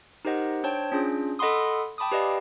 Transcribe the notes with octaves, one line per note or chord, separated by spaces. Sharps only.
D#4 G4 A#4 C5 D#5 F#5
D4 C5 C#5 G5 A5
C#4 D4 F4 G#4
A4 D#5 F#5 B5 C6 D#6
G5 A5 B5 D6 D#6
G4 B4 D5 D#5 F5